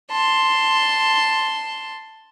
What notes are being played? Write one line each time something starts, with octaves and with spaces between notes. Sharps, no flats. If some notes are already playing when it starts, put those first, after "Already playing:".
A5 C6